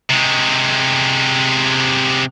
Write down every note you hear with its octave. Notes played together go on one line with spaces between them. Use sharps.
C3 G#3